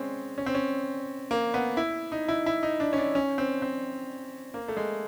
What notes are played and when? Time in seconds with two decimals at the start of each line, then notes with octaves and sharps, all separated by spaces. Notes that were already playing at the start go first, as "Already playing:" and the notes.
Already playing: G#3 C4 C#4
0.38 C#4
0.46 C4
0.55 C#4
1.31 A#3
1.54 B3
1.77 E4
2.12 D#4
2.28 E4
2.46 E4
2.63 D#4
2.80 D4
2.93 C#4
2.98 D4
3.15 C#4
3.38 C4
3.62 C4
4.54 A#3
4.68 A3
4.77 G#3